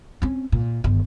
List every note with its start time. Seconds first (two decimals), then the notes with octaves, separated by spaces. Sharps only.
0.22 C4 C#4
0.52 A#2
0.84 G1 D#3